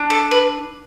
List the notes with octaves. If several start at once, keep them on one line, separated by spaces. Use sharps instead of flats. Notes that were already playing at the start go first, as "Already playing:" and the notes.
Already playing: D4
A4
B4